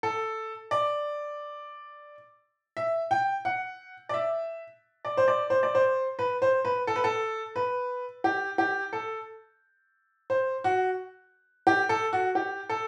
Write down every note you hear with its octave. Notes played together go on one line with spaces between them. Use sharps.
A4
D5
E5
G5
F#5
D5
E5
D5
C5
D5
C5
D5
C5
B4
C5
B4
A4
B4
A4
B4
G4
G4
A4
C5
F#4
G4
A4
F#4
G4
A4